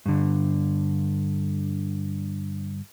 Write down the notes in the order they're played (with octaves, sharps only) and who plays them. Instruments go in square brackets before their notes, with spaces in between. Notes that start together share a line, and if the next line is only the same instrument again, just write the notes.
[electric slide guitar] G2 D3